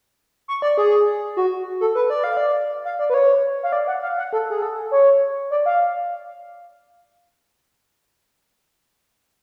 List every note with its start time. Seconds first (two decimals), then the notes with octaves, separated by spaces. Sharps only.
0.48 C#6
0.62 D5
0.78 G#4
1.37 F#4
1.81 A4
1.95 B4
2.10 D5
2.24 F5
2.37 D5
2.85 F5
2.99 D5
3.10 B4
3.14 C#5
3.63 F5
3.73 D5
3.88 F#5
4.03 F5
4.18 F#5
4.33 A4
4.50 G#4
4.62 A4
4.91 C#5
5.51 D5
5.66 F5